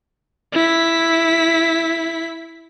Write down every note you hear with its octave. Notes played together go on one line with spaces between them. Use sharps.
E4 B6